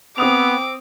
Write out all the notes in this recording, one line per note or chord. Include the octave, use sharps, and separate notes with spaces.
B3 C4 D6 D#6 F7